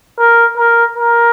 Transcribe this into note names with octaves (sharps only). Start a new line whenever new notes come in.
A#4
A#4
A#4